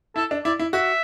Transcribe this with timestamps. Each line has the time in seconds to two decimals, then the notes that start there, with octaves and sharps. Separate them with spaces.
0.16 E4 A4
0.31 D4
0.45 E4 D5
0.59 E4
0.73 F#4 E5